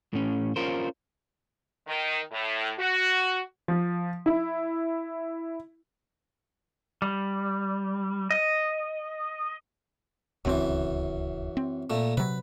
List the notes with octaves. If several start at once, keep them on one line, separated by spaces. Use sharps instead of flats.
A2 C#4
C#4 F4 A#4 C5
D#3
A2
F#4
F3
E4
G3
D#5
D1 C#2 F#2 E3 C4
C4
A#2 A3
C3 F#3 B4